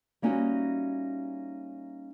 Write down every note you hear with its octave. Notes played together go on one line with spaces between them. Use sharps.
G3 A#3 C#4 D#4 E4 F#4